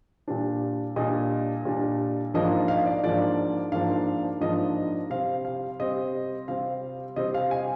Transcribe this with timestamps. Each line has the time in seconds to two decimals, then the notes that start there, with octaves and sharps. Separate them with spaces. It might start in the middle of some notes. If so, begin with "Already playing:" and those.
0.28 A#2 G3 D4
0.96 A#2 G3 D4 D#5
1.65 A#2 G3 D4
2.34 G#2 F3 A#3 D4 D#5
2.51 D#5
2.68 F5
2.86 D5
3.03 G#2 F3 A#3 D4 D5
3.72 G#2 F3 A#3 D4 F5
4.41 G#2 F3 A#3 D4 D#5
5.10 C3 G3 C4 F5
5.45 F5
5.79 C3 G3 C4 D#5
6.48 C3 G3 C4 F5
7.16 C3 G3 C4 D#5
7.34 F5
7.51 G#5